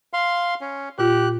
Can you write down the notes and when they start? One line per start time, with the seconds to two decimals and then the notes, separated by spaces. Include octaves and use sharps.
0.13 F5 C6
0.61 C#4
0.99 A#2 F4 G4 F#6